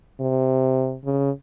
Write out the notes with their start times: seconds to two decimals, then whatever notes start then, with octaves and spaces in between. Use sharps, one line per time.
0.20 C3
1.05 C#3